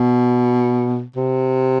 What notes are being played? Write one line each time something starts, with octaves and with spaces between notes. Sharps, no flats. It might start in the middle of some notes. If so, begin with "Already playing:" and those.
Already playing: B2
C3